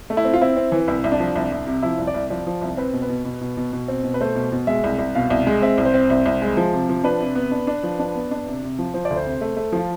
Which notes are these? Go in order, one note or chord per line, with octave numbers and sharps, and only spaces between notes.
A3
E4
C4
F4
C4 E4
C4
E3
C2 E4
C2
D4
F3
C2
C2
C3
F3 E4
C2
D5
C2
F3 D5
F3
C2
C4 B4
B2
B4
B2
B2
B2
B2
B2
C4
B2
B4
A3 C5
B2
B2
G#3 E5
C2
C2
B2 F5
C2
G#3
C4 E5
C2
C5
C4
C2
C2
G#3
F3
C3
F3
D4 B4
C3
B3
D4
D4
F3
D4
B3
D4
C3
C3
F3
F3 C5
D5
D2
C5
C3
A3
A3
F3 F4